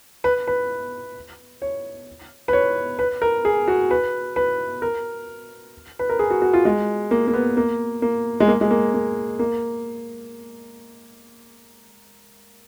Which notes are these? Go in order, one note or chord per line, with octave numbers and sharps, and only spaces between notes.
B4
B4
C#5
B4
C#5
B4
A#4
G#4
F#4
B4
B4
A#4
B4
A#4
G#4
F#4
F#4
F4
G#3
A#3
A#3
B3
A#3
A#3
G#3
A#3
G#3
A#3
A#3
A#3